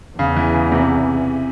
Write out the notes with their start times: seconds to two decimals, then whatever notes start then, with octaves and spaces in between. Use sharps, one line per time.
0.18 E2 C#3
0.36 E3
0.54 C#3
0.72 C3